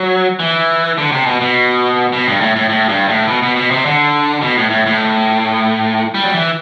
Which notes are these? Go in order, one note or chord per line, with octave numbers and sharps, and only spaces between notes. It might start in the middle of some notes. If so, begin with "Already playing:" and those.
Already playing: F#3
E3
D3
C3
B2
B2
B2
G2
A2
A2
A2
G2
A2
B2
B2
B2
C3
D3
B2
A2
A2
A2
G3
F#3
E3